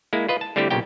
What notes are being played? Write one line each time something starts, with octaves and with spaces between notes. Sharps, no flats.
G#3 A#3 E4
F4 B4 D#5
A5
D3 G3 A3 C4 E4 G4
B1 A#2 C#3 G4 G5